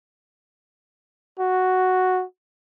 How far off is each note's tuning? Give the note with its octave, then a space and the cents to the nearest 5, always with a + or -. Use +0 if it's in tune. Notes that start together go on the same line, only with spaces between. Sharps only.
F#4 +0